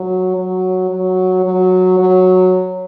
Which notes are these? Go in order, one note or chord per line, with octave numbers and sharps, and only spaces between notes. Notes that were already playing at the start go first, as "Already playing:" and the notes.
Already playing: F#3
F#3
F#3
F#3
F#3